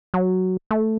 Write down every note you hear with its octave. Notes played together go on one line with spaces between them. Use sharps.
F#3
A3